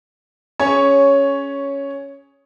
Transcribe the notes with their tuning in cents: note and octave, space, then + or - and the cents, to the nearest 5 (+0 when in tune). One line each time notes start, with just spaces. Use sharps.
C#4 +5 G#4 +0 C#5 +0